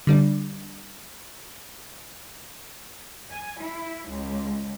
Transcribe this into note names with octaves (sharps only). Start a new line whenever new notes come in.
D3 G3 D4
G#5
E4
C#2